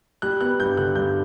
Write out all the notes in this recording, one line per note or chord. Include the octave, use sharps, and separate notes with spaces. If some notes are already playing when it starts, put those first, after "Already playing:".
G3 F#6
B3 F#6
G2 G6
D3 F#6
G2 G6